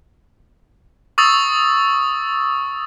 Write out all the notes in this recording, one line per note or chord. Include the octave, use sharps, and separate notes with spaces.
C#6 D#6 E6 A6